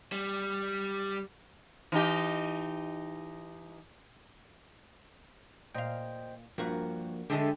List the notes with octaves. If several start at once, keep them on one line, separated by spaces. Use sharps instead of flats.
G3
E3 D#4 G4
A#2 C5 D#5 F5 G5
G2 F3 A#3 F#4 A#4
D3 G#3 A3 G4 A4 D#5